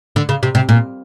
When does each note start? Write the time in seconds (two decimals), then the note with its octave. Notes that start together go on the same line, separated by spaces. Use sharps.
0.16 D3
0.29 C#3
0.43 C3
0.55 C3
0.69 A#2